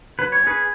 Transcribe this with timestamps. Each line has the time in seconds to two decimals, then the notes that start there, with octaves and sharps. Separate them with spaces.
0.19 F#3 B4
0.32 C#5
0.43 C#4 G#4 B4